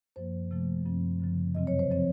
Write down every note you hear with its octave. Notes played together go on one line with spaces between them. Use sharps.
F#2 F3 A#3 C5
C3 F3 A3
F#2 F3 C4
F#2 C#3 F3
F2 C3 F#3 C4 D#5
C#5
C5
C#3 F3 C4 C#5